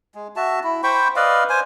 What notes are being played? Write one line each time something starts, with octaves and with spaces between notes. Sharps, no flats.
G#3
F#4 E5 A5
E4
C5 G5 B5 C#6
B4 D5 D#5 F5
C5 G#5